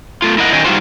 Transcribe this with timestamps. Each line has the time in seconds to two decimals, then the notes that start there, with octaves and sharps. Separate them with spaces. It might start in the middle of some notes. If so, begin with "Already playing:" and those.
0.22 A3 F4
0.38 E4 A#4 D#5 F#5
0.53 D#3 F#3 C#4 D#5 G5 G#5
0.64 G3 D#4 F4 F#4 C5